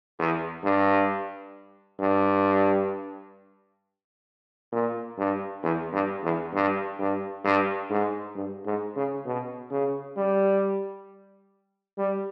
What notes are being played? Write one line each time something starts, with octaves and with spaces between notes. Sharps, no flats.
E2
G2
G2
A#2
G2
E2
G2
E2
G2
G2
G2
G#2
G2
G#2
C#3
B2
C#3
G3
G3